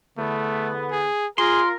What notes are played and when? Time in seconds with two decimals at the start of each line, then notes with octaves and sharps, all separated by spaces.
0.18 E2 D3 A3 B3
0.91 G#4
1.38 F4 G#4 A#4 C6